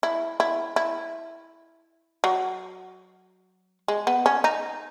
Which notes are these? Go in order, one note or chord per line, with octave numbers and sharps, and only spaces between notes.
E4
E4
E4
F#3
G#3
B3
C#4
D#4